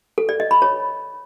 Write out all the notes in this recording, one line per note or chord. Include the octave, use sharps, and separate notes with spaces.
A4
D5
D#5
B5
C#5